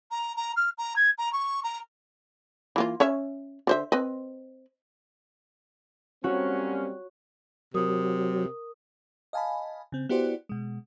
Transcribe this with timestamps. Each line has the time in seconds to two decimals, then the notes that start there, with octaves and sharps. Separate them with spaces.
0.11 A#5
0.36 A#5
0.56 F6
0.78 A#5
0.96 G#6
1.18 A#5
1.33 C#6
1.63 A#5
2.76 E3 A#3 F4
3.00 C#4 C#5 E5
3.67 D3 C5 E5
3.92 C4 B4 D#5
6.24 F#3 G3 A#3 C4 C#4 F#4 C#5
7.74 C3 F#3 A#4 D#6
9.33 D#5 F5 G#5 A5 B5
9.92 C#3 C4
10.09 B3 E4 F#4 G4 C5 D5
10.49 B2 G#3